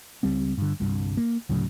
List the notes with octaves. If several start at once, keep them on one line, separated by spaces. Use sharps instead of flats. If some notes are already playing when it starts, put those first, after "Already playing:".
C#2 G3 C4
G2 D3
G1 C2 G2
A#3
D2 A2 C#3 F#3